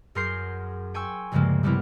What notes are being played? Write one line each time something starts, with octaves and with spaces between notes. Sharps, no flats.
F#2 G#4 A#4 C6 G6 C7
G5 G#5 C6 C#6 E6
D2 G2 C#3 F3 G#3 A#3
C3 G3 A#3 B3 E4 A#4